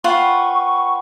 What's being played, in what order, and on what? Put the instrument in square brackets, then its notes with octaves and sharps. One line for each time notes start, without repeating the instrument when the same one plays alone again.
[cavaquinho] F4 B4 C5 [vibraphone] F#5 G5 B5 [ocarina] C#6